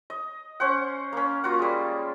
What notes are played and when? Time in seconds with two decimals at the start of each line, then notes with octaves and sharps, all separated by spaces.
0.10 D#5
0.60 C#4 C5 F#5
1.13 A#3 C#4
1.44 A#3 F4 F#4 F#5
1.59 G3 G#3